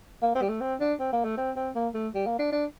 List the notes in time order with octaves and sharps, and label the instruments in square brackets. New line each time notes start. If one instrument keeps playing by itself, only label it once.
[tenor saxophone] A#3
C4
G3
A3
C4
D4
C4
A#3
A3
C4
C4
A#3
A3
G3
A#3
D4
D4